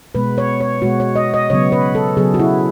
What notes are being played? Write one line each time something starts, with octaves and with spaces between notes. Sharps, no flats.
B2 G#3 B3 B4
C#5
C#5
B2 G#3 B3 F#4
C#5
D#5
D#5
C#3 F#3 B3 C#5
B4
A4
C#3 F#3 B3 G#4
F#4
E4